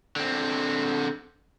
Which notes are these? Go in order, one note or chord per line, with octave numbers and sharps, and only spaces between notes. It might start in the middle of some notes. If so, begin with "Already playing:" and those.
D3 C4